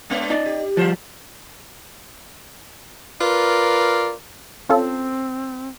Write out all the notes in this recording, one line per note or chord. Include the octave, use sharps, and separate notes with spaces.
G#3 B3 D4
D#4 D5
G4
F3 G3 F4 C5
F4 A#4 B4 D5
C4 C#4 F4 A4